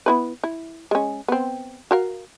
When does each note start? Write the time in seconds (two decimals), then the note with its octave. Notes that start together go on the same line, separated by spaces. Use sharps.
0.06 B3 E4 B4
0.44 E4
0.91 G#3 C#4
1.28 B3 C4
1.91 F#4 A#4 F5